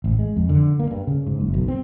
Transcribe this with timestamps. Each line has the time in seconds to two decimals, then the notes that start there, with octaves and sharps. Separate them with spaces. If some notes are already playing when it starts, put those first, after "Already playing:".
0.04 A1
0.19 G#3
0.37 F2
0.49 D3
0.79 A#3
0.91 G2
1.07 C#3
1.27 G#2
1.40 F#1
1.54 B1
1.68 C4